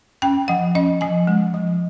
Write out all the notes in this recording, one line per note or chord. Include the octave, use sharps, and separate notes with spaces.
C#4 G5
F3 F#5
C#4 D#5
F3 G#5
G#3
F3